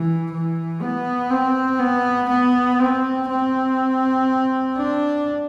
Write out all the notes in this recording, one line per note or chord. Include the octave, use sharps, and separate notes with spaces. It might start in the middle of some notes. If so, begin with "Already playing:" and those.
Already playing: E3
E3
B3
C4
B3
B3
C4
C4
D4